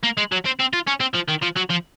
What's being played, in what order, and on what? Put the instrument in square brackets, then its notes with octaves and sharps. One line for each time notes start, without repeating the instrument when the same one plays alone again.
[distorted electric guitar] A#3
G#3
F#3
C4
C4
F4
C#4
C4
F3
D#3
F3
F#3
F3